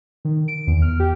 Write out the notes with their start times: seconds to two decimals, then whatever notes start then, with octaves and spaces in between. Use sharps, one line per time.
0.25 D#3
0.48 D7
0.67 E2
0.82 F6
1.00 G4